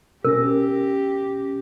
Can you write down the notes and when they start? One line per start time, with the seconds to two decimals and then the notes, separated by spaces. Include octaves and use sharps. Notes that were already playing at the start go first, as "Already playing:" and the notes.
0.25 B2 C#4 G4 A#4 A#6